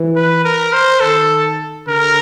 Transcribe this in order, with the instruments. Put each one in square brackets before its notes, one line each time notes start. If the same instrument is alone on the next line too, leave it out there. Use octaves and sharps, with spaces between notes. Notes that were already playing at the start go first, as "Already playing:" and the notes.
Already playing: [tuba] E3
[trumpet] B4
A#4
C5
[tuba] D#3 [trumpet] A4
[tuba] D3 [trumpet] A#4